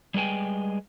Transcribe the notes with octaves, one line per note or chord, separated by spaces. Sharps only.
G3 G#3 B4 G5 G#5